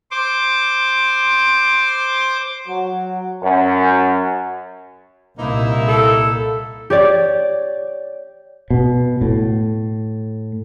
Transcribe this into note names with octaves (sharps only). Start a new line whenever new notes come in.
C5 D6
F#3
F#2
C2 A#2 A#3 D#4 E4
A4
G4 C#5 D5
B2
A2